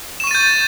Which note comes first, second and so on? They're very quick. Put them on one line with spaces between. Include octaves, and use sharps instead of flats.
E7 C#6 D#7 A6 G6